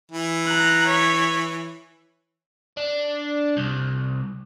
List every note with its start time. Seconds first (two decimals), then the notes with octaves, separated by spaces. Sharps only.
0.11 E3
0.47 A#5 F#6
0.86 C#5 B6
2.77 D4
3.57 C2